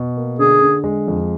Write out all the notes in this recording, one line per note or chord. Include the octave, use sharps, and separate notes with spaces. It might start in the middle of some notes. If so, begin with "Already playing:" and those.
Already playing: B2
A#3
D3 G#4
D3
G#3
F2